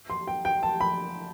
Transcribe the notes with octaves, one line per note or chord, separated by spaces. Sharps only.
C6
G5
G5
A5
B5